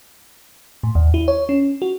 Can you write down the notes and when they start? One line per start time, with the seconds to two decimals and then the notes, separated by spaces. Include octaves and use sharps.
0.83 A2
0.95 D#2
1.14 E4
1.28 C#5
1.49 C#4
1.82 F#4